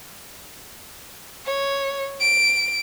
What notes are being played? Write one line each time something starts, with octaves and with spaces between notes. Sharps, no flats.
C#5
D7